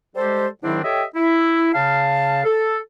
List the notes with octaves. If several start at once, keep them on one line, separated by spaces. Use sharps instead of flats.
G3 G#3 G4 A4 C5
G#2 D#3 F#3 C4 D4 E4
G4 A4 C#5 D#5 E5 G5
E4
C#3 F5 A5
A4